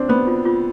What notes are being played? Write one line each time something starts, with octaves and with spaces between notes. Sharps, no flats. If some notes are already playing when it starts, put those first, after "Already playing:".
Already playing: C4 D4
B3 C5
F4
F4